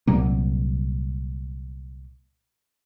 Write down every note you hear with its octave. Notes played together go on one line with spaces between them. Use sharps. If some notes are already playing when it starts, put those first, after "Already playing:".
C2 A#2 F#3 A#3